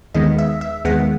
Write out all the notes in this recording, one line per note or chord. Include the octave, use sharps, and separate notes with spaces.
D#2 D#3 G#3 B3 D#5
E5
E5
D#2 D#3 G#3 B3 F#5